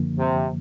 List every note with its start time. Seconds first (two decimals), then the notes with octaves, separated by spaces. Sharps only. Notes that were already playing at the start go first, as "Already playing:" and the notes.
Already playing: F#2 D3 F3 A#3
0.19 C3